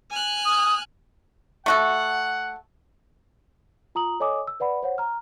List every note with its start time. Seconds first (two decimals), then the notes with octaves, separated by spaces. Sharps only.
0.11 G#5 F6 F#6
0.45 D#6
1.66 A3 F#4 A4 F#5
3.95 F4 A#5 D#6 F#7
4.20 A4 C#5 D#5 G#5 D6 D#6
4.47 E6
4.60 B4 D5 F#5 B5
4.83 C5 C#5 F#5
4.98 A#5 F6